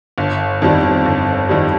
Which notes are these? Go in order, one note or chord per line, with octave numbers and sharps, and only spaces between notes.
G1
F2 D#3 G3
G1
F2 D#3 G3